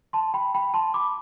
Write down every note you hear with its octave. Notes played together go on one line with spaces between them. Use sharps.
A5 C6
G5 B5
G5 B5
A5 C6
B5 D6